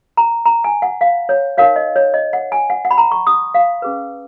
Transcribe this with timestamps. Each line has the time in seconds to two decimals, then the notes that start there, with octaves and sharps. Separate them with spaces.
0.17 A#5
0.46 A#5
0.64 G#5
0.82 F#5
1.01 F5
1.29 C#5
1.58 D#4 A#4 C#5 F5
1.76 D#5
1.96 C#5
2.14 D#5
2.33 F#5
2.52 G#5
2.70 F#5
2.85 F#5
2.91 B5
2.98 A#5
3.12 C#6
3.27 D#6
3.55 F5
3.82 C#4 G#4 B4